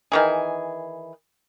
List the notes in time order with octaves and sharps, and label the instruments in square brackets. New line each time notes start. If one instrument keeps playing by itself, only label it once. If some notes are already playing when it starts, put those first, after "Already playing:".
[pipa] D#3 E3 G#4